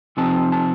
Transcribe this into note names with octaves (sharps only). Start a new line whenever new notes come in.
C3 F3 C4 D#4 A5
A5